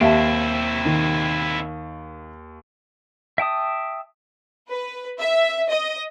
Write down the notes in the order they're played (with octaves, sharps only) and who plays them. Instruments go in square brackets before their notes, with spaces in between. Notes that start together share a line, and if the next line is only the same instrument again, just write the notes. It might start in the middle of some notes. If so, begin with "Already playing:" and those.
[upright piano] D#2 [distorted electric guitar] C4 E4 [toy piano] E5 F5 A5
[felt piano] D#3
[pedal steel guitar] E5 G5 A5 D#6
[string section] B4
E5
D#5